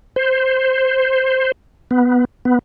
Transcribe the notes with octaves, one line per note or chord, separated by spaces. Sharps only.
C5
B3
B3